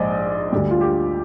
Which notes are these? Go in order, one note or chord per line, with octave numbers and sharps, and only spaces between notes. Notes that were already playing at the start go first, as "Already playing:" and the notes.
Already playing: A#1 G#2 C5 D5 D#5
D2 D3 G3
F4
G4